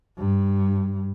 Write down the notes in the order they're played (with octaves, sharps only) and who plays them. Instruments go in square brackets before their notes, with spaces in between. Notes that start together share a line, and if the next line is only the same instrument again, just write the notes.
[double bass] G2